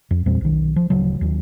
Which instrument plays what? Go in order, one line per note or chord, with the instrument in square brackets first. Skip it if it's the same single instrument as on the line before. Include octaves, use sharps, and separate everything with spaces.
[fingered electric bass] F2
E2 A#2 G3 C4
B1 D#3
F3
D1 C#3 F#3
D#2 F#3